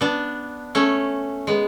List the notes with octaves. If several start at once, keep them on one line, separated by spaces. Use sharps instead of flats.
B3 D4
A3 C#4
G#3 B3